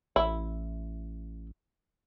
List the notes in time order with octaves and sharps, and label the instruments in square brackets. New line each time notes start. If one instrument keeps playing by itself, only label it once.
[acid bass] A1 [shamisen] E4